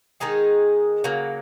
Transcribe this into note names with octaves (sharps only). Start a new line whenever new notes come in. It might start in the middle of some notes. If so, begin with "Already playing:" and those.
D#3 G#3 D#4 G#4
C#3 F#3 A#3